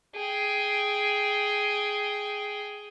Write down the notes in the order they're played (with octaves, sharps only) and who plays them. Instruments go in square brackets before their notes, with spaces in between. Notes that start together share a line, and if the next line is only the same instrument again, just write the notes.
[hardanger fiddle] G#4 G5